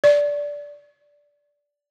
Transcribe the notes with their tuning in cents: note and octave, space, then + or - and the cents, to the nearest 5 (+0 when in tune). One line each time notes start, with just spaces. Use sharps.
D5 -10